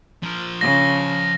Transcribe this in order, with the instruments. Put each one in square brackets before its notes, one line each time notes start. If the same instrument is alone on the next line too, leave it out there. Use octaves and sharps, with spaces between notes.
[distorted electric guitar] F3 A#4
[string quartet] C#3 [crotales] A#6